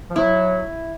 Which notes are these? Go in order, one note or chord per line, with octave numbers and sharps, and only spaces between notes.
F3
F#3 E4